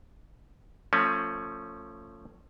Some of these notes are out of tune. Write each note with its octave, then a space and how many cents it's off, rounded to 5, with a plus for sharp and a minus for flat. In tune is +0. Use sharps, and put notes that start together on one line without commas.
F3 +0 A3 +30 C#4 +0